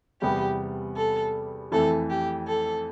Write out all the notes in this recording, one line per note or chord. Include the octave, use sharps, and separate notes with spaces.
E2 C3 G3 B3 G4
A4
F2 E3 A3 A4
G4
A4